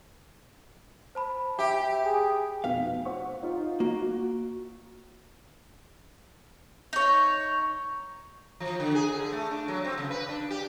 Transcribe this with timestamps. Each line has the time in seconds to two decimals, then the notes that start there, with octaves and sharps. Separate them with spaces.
1.15 C5 A5 B5
1.59 G4 E5
2.04 G#4
2.64 F1 B2 F5 B6
3.05 C5 F#5 C#6
3.43 D#4 F4
3.80 A#3 F#4
6.93 D#4 C#5
8.60 F3
8.80 D3
8.95 G#4
9.14 D3
9.32 A3
9.51 D4
9.68 F#3
9.85 C4
9.98 C#3
10.11 B4
10.29 D4
10.50 G4